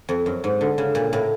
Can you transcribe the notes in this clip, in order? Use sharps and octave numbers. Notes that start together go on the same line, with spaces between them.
F2
F#2
G#2
D3
C#3
A#2
A2